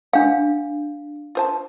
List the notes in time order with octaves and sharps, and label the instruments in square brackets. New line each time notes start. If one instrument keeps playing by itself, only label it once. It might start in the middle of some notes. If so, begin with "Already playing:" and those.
[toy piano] D4 F5 [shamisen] F#5
[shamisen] F4 C5 A5